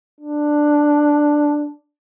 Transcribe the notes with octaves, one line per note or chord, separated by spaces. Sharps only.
D4